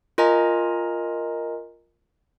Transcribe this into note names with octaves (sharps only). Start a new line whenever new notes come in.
F4 A#4 D#5 G#5 A#5